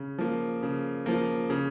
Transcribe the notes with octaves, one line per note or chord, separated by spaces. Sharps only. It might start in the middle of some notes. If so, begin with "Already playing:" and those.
Already playing: C#3
F3 A#3
C#3
F3 A#3
C#3